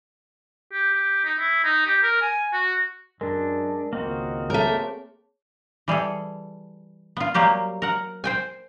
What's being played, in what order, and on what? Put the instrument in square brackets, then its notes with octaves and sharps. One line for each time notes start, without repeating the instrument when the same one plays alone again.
[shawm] G4
G4
D#4
E4
D#4
G4
A#4
G#5
F#4
[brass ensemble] F#2 [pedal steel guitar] G#3 D4 [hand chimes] A#4
[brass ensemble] G#1 C#2 D#5 [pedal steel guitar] A#3 C4 F#4
[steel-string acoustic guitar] A3 A#4 [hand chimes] G#4 C#5 A5
[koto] E3 G3 G#4 A4
B3 F4
F#3 G3 A#3 G4 C5
A#4 F#5
C5 G5 G#5